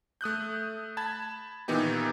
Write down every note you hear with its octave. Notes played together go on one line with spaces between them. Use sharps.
A3 D#6 F#6 G6
A5 B5 G#6
A#2 D#3 E3 B3 D#4 G4